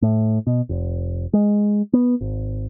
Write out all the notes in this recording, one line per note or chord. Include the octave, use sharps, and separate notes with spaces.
A2
B2
F1
G#3
B3
G#1